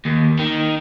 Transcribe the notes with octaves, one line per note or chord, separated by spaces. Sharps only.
D#2
D#3